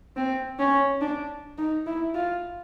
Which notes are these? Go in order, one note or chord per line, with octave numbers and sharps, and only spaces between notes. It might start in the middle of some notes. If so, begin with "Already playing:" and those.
C4
C#4
D4
D#4
E4
F4